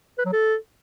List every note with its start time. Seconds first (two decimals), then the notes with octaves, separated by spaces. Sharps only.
0.18 B4
0.26 F#3
0.33 A4